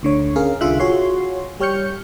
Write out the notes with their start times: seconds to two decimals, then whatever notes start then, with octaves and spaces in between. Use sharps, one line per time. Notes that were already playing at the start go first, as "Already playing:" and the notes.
0.03 D2 D3 C#5
0.36 C#4 G#4 A#4 F5
0.61 C2 D3 F4 G#4 E5 F#6
0.80 F4 F#4 G#4 C#5 C6
1.60 G3 G4 C#5 F6 G6 C#7